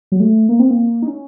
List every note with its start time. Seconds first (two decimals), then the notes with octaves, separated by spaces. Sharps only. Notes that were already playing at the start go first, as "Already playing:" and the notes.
0.12 F#3
0.20 A3
0.49 A#3
0.60 C4
0.71 A#3
1.02 D#4
1.08 C#4